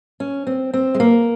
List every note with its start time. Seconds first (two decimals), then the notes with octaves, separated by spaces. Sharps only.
0.20 C#4
0.47 C4
0.74 C4
0.94 G#3
1.00 A#3